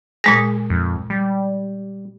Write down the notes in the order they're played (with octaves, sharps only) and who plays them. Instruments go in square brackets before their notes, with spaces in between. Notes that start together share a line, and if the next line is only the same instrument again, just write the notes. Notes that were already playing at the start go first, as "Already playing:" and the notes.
[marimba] A#2 G#3 A#6 [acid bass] G#4
[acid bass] F2
G3